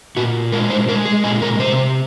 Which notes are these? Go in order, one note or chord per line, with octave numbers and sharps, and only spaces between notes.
A#2 F#4
G#3 A#4
C5
G#3 A#4
G#4
A#2 G#4
A#4
C3 C5